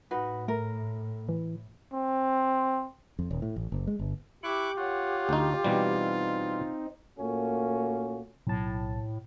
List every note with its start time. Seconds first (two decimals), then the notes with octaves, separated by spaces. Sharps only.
0.11 A2 D#4 F#4 B4
0.48 A3 A#4
1.29 E3
1.93 C4
3.19 F2
3.31 D#1
3.42 A2
3.56 A1
3.72 F#1
3.87 G#3
3.99 G1
4.43 E4 G4 C#6 D6 F#6
4.78 F4 C#5 F#5
5.29 D2 D#4
5.64 B2 E3 G3 C4 D#4
7.19 A#2 A3 A#3 C#4 F#4
8.47 B1 A2 A5